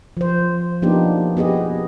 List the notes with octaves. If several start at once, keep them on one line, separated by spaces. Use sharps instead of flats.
F3 C5
F3 A#3 B3 D4 D#4 G4
B3 G4 G#4 D#5